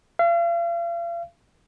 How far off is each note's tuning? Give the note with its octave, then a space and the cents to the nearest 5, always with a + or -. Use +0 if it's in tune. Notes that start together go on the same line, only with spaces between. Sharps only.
F5 -40